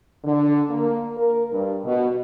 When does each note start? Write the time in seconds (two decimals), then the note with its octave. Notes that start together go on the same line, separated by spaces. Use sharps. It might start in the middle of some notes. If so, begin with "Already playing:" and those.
0.24 D3
0.69 A#3
1.17 A#4
1.52 G2
1.85 B2